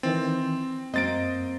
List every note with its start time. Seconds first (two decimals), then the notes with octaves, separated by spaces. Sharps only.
0.03 D#3 E3 C4 A6
0.94 F#2 A#3 C4 D#5 A6 D7